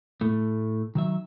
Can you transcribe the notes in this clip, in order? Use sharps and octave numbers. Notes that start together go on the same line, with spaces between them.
A2 A3
D#3 F#3 E5